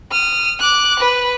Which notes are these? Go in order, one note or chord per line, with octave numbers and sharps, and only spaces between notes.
D#6 F6
D6 F#6
B4